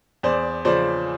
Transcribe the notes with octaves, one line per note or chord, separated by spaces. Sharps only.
E2 C5 D5
C#3 F3 C5 D5